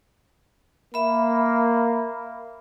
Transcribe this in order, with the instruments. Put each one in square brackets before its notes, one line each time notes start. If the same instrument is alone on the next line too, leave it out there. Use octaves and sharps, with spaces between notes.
[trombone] A#3 [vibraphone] E5 B5